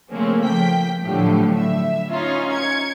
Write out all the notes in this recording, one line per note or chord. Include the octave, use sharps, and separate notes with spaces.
C#3 F3 A3 A#3 C4 C#4
F3 G5 B6
A2 D3 F3 F#3 A3 G4
E5
C#4 D#4 F4
G#6 C#7